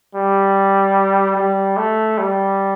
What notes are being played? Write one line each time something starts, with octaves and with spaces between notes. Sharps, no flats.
G3
G3
A3
G3